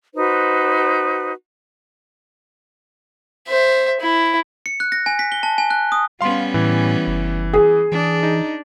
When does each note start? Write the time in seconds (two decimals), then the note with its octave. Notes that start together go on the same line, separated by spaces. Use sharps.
0.14 D#4 F#4 B4 C5
3.48 C5 E5
4.00 E4
4.66 C#7
4.80 F#6
4.92 A#6
5.06 G#5
5.19 B6
5.32 G7
5.43 A5
5.58 G#5
5.70 F#6
5.92 D#6
6.21 G3 B3 C#4 F5 C6
6.54 A2 E3
7.07 F#1
7.53 G#4
7.92 E3 D4
8.23 D#4